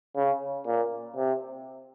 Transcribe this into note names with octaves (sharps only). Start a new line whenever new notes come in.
C#3
A#2
C3